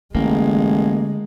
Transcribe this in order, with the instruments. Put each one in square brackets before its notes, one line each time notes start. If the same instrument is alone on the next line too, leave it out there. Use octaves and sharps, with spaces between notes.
[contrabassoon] A1 [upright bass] D3 [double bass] G#3 [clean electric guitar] A#3